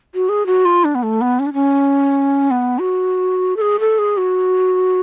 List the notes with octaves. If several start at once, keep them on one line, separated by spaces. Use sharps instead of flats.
F#4
G#4
F#4
F4
D4
B3
A3
B3
C#4
D4
C#4
B3
F#4
A4
G#4
A4
G#4
F#4